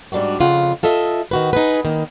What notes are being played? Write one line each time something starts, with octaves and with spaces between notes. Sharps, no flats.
G#2 G3 D4 F4 F#4
F2 C#3 F4 F#5
F4 A4 D#5 E5
D#3 F#4 B4
D#4 G#4 B4
D#3 A#3